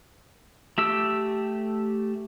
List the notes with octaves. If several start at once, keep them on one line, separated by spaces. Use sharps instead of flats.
A3 G4 E6